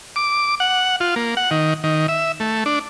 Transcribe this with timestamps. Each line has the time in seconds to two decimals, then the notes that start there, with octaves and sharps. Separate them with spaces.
0.16 D6
0.60 F#5
1.00 F4
1.16 A#3
1.37 F#5
1.51 D#3
1.84 D#3
2.08 E5
2.40 A3
2.66 D4